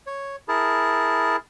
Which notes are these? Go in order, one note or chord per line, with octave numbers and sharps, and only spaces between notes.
C#5
E4 G#4 A#4 A5